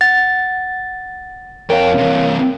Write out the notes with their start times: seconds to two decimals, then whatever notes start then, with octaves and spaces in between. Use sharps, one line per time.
0.01 F#5 A6
1.70 F2 A#4 C#5 F5 G5
1.98 C3 E3